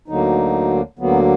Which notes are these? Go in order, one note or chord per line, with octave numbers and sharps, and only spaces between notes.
D2 D3 F#3 A#3 D#4
D2 D3 F#3 A#3 B3